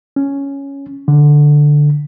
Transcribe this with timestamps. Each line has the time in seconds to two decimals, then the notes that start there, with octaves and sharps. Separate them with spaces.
0.16 C#4
1.08 D3